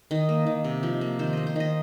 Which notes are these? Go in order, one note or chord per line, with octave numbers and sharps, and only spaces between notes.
D#3 D#5
A#3
D#3
C3
F3
A#3
D#3 C5
A#3 D#5
C5
D#3 D#5